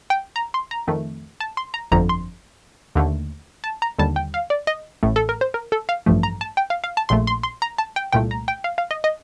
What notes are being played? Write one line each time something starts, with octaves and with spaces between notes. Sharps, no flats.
G5
A#5
C6
A#5
F2 D#3 A3
A5
C6
A#5
G1 F2 D3 F3 A#5
C6
D#2 D3 A3
A5
A#5
D#2 D3 G3 A5
G5
F5
D5
D#5
A1 A2 A3
A4
A#4
C5
A#4
A4
F5
A1 G2 F3 A3
A#5
A5
G5
F5
F5
A5
A#1 A#2 A3 C6
C6
C6
A#5
A5
G5
C2 A#2 A3 G5
A#5
G5
F5
F5
D#5
D#5